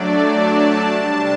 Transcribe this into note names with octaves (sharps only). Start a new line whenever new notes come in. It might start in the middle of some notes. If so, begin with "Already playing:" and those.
Already playing: F#3 A3 D4 D5
A5
C3 G3 D4 A5